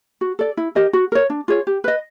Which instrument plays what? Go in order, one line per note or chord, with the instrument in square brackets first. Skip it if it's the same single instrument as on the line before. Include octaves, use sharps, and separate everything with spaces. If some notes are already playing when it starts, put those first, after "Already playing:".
[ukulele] F#4
A4 D5
E4
G4 A#4 D#5
F#4
A#4 C#5
D4
F4 G#4 C#5
G4
B4 D#5